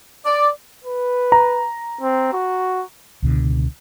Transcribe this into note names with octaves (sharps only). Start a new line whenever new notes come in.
D5
B4
A#5
C4
F#4
C#2 B2 D3